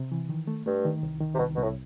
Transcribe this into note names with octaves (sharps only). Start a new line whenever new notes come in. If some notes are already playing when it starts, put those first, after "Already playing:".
Already playing: C3
E3
D#3
A3
G2 A3
D#3
C2
D#3
C3
C2 B2
C2 B2
A2